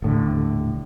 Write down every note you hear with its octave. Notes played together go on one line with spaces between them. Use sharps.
D#1 A2 D3